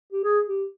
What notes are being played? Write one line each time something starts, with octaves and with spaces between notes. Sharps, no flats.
G4
G#4
G4